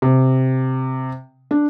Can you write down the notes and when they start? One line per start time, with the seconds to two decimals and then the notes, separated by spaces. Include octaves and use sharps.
0.02 C3
1.51 D4